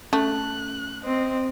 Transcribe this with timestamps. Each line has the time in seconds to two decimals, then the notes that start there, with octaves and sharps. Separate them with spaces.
0.13 A3 C#4 F#6
1.05 C4 D#5